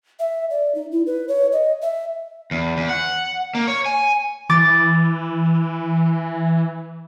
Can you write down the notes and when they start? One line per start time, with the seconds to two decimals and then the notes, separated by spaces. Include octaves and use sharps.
0.19 E5
0.50 D5
0.75 D#4
0.92 E4
1.06 B4
1.28 C#5
1.52 D#5
1.82 E5
2.51 E2
2.77 E2
2.89 F#5
3.55 A#3
3.68 C#5
3.86 G#5
4.50 E3 D6 A6